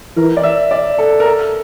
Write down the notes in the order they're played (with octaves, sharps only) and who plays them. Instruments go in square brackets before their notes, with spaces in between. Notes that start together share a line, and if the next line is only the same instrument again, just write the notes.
[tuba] E3 [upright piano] A#4
[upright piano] D5
E5
D5
A4
A#4
A4